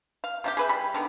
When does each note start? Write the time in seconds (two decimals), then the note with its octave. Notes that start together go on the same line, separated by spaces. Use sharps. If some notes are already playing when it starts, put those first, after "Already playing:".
0.24 F5
0.44 C3 A3 G4
0.57 G#4 B4 E5
0.69 G3 B5
0.94 D3 D#3 B3